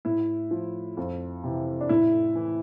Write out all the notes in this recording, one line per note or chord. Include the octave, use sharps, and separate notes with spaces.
A2 E4
F3
F2
C3 E3
D4
A2 E4
E3